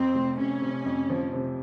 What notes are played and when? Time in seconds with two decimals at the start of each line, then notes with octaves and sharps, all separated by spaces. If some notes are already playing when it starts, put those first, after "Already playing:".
Already playing: F2 C4
0.14 F1
0.38 C3 C#4
0.62 C3
0.86 F2
1.10 F3
1.33 C3